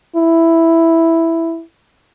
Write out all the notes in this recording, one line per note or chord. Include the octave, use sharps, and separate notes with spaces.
E4